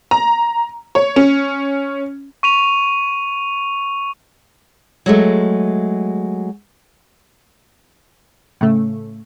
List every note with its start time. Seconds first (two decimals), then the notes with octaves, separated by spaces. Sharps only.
0.11 A#5
0.95 C#5
1.16 C#4
2.43 C#6 D#7 F7
5.06 F#3 G#3 A3
8.61 A2 C#3 A3